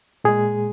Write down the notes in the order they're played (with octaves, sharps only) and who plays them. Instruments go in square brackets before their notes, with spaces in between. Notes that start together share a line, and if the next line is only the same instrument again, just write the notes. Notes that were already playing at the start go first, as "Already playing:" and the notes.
[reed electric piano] A#2 G#3 G#4